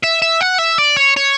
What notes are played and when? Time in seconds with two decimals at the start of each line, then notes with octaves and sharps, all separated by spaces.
0.03 E5
0.22 E5
0.41 F#5
0.59 E5
0.78 D5
0.96 C#5
1.16 C#5